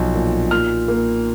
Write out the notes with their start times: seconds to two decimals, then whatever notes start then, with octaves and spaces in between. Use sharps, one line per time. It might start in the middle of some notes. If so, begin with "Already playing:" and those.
Already playing: B1 F3
0.14 A#2
0.51 A#2 F6
0.88 A#3